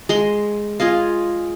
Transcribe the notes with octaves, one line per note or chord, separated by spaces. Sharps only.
G#3 A#5 C6
F4 G#4 D#5 F5